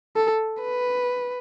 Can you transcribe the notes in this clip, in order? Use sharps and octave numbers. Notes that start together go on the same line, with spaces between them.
A4
B4